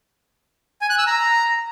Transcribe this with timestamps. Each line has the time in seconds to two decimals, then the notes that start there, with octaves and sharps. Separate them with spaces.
0.81 G#5
0.90 F#6
0.98 E6
1.07 A#5